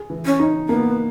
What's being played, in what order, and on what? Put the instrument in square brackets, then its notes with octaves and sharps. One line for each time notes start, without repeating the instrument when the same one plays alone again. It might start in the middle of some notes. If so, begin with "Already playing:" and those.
Already playing: [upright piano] G#4
E3
[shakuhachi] C#4
[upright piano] D#4
[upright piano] A#3 [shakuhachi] B3